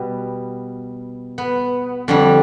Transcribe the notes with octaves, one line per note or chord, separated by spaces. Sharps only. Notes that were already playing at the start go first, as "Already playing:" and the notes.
Already playing: B2 G3 B3
B3
F2 D3 G3